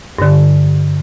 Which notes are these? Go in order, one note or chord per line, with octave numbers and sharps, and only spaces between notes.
G2 D3